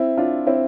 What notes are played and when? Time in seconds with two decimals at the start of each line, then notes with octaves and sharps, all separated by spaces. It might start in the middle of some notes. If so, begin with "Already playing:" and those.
Already playing: C4 E4
0.17 D4 F4
0.47 C4 E4